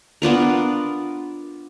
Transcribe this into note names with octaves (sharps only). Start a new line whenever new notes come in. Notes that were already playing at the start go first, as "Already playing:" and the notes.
B3 D4 F4 A#4